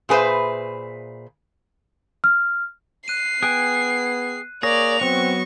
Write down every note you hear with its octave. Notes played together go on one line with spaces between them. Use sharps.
A#2 G#4 B4 C5 E5
F6
F#6 C7 D#7
B3 G#4 G5 G#5 F#6
A#3 G#4 C#5 D5 A#6 F7
F#3 B3 C4 C#6